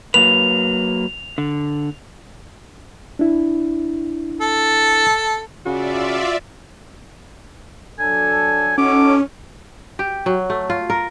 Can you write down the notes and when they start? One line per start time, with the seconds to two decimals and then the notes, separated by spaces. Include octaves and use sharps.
0.14 F#3 A#3 B4 F7
1.38 D3
3.19 D4 E4
4.41 A4
5.66 C#3 F4 F#4 D5 E5
8.00 F#3 D4 A4 G#5
8.78 C#4 D#4 F#4 A4 D6
9.99 G4
10.26 F#3
10.50 A3
10.70 F4
10.90 A#4